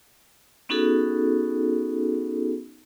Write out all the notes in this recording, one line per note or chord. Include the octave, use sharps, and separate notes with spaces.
B3 C#4 D#4 F#4 G#4 A4